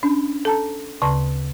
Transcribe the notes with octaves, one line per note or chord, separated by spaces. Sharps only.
C#4 D4
A4 A5 A#5
D2 C#3 A5 C6